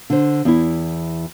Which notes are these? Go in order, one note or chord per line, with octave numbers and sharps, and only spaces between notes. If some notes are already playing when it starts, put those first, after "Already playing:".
D3 C5
E2 E4